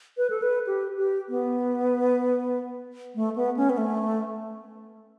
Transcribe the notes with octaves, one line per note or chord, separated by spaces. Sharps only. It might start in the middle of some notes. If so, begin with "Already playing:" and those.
B4
A4
B4
G4
G4
B3
A3
B3
C#4
B3
A3